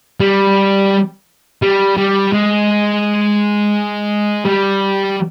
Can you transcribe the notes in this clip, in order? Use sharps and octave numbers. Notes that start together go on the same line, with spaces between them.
G3
G3
G3
G#3
G3